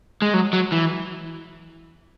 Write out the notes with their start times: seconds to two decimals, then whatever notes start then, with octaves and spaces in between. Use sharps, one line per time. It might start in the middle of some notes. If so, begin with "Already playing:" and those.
0.22 G#3
0.34 F#3
0.53 F#3
0.72 E3